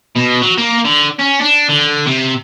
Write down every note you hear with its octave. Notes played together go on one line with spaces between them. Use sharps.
B2
F#3
A#3
D3
C#4
D4
D3
C3